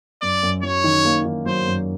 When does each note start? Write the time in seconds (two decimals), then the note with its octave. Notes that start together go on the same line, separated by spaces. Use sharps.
0.22 F#2 D5
0.43 F#2
0.63 F#3 C#5
0.84 D#3
1.05 A#3
1.25 D#3
1.46 F#3 C5
1.67 F#2